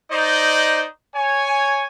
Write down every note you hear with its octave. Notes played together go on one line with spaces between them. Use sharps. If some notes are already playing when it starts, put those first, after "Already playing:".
D#4 C5 D5 D#5
C#5 G#5